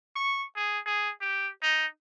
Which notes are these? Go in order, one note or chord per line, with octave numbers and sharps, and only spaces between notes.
C#6
G#4
G#4
G4
D#4